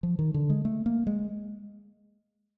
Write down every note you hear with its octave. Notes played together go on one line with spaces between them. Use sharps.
F3
D#3
D3
G#3
A3
A#3
G#3